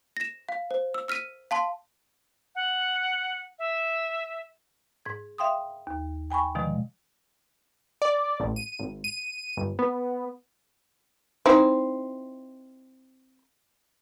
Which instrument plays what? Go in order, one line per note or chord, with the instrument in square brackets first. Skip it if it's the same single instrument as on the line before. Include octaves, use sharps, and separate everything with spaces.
[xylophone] A#6 E7
F5
C5
E6
E6 F6 B6 D#7
F5 A5 C6
[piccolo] F#5
E5
[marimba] G#2 G#6
E5 F5 G5 C6 D#6
D#2
G5 G#5 B5 C#6
B2 D3 D#3 F3 G#3
[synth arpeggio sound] D5
A1
D#7
G#1
D#7
G1
B3
[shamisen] C4 D#4 E4